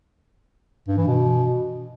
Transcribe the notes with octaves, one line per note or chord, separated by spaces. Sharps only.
G2
E3
B2